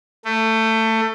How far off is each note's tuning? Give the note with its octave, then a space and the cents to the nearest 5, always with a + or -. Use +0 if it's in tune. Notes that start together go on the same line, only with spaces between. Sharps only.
A3 +20